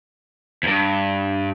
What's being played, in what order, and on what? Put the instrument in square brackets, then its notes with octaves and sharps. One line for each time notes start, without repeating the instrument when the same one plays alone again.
[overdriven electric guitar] E2 G2